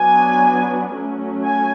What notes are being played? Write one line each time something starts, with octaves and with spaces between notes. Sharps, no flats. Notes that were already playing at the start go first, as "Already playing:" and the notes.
Already playing: F#3 B3 D4 G#5
F#3 A3 C#4
G#5